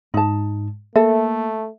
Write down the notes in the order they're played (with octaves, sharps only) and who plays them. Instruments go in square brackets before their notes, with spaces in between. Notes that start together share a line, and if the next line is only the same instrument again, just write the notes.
[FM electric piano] G#2 [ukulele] D#4 A5
[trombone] A3 [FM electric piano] A#3 [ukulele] A4 [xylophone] E5